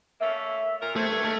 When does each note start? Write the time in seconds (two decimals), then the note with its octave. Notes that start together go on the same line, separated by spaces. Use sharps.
0.20 A3 A#3 C#4 E5
0.81 A#2 A#4
0.96 A3 C4 G#6
1.09 G2
1.24 D#3 G#3 A3 C#4